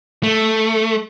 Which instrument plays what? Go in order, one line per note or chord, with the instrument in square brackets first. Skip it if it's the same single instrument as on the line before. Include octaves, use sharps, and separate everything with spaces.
[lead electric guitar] A3